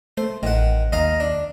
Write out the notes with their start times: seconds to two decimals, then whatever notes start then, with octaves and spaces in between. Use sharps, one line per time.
0.17 A3 C5
0.43 A1 D#3 F#5
0.92 D#2 D#5 F5 A#5
1.20 D4